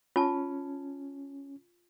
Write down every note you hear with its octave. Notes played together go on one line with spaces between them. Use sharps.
C#4 F4 A5